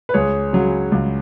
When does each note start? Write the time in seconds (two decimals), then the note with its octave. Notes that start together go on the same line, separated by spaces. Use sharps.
0.09 B4
0.14 C#2 G#4 C#5
0.53 C#3 F#3
0.92 C#2